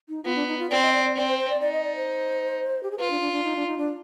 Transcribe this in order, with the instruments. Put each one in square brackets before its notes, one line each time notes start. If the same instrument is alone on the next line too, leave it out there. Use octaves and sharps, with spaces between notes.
[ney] D#4
[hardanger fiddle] B3 [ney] F4
[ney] D4
D#4
F4
[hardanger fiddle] C4 [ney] D5
[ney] D#5
D5
D5
[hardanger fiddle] C4 [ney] D5
[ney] C5
C5
D5
[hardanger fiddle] D#4 [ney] D5
[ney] D#5
D5
C5
G4
G#4
[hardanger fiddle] F4 [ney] B4
[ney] D4
D4
D4
D#4
D4
D#4
D4